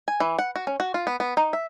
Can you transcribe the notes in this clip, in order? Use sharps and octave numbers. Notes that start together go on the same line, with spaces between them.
G#5
E3
F#5
F#4
C#4
F#4
F4
B3
B3
D#4
E5